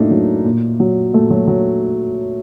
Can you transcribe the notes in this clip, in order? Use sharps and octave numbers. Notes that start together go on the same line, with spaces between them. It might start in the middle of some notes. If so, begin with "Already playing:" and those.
Already playing: A2 F#3 A3 A#3 D4 D#4
F#3
A#2
F#3
A#2 A3
F#3
F#3